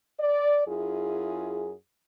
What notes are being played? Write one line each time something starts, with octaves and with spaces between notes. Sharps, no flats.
D5
F#2 E4 F4 G#4